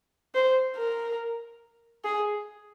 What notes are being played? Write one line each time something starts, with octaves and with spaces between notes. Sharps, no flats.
C5
A#4
G#4